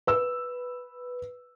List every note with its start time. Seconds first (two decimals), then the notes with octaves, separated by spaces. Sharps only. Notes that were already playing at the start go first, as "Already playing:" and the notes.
0.07 B4 E6